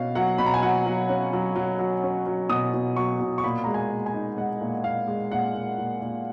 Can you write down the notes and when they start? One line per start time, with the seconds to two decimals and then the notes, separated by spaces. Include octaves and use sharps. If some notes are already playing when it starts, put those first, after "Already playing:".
Already playing: B2 C#4 F5
0.15 F#3 F#5
0.38 B2 B5
0.46 A#5
0.54 G#5
0.62 F#3 F#5
0.86 F#3
1.09 C#4
1.33 F#3
1.56 F#3
1.79 F#3
2.03 C#4
2.26 F#3
2.49 B2 D#6
2.74 B2
2.96 F#3 C#6
3.21 B2
3.38 C#6
3.43 A#2 B5
3.64 G#3 A#5
3.74 G#5
3.91 A#2
4.06 G#5
4.14 D#4
4.37 G#3 F#5
4.61 A#2
4.84 A#2 F5
5.08 G#3
5.31 A#2 F#5
5.54 A#2
5.78 A#2
6.01 A#2